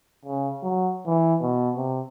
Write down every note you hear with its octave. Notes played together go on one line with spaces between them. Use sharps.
C#3
F#3
E3
B2
C3